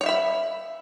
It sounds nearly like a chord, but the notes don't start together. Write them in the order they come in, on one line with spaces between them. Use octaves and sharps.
C#5 F5 E5 B5